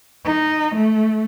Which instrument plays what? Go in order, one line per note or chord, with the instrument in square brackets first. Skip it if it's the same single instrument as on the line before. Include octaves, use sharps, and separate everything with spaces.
[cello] D#4
A3